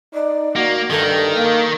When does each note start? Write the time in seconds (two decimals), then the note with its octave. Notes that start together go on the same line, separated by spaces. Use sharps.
0.14 D#4 D5
0.56 A#3 F#4
0.90 G2 D#3 A4
1.36 A#3